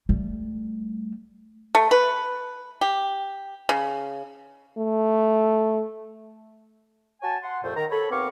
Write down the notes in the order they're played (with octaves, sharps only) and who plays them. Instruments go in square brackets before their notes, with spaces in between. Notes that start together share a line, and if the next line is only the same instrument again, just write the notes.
[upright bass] G3 A3
[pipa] A3
B4
G4
C#3
[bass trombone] A3
[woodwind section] F#4 C#5 G#5 A5
F#5 C6
C2 F2 A#2 A3 C5
D#3 A#5
A4 C#5 B5
D#2 B3 C4 F5 C#6 D6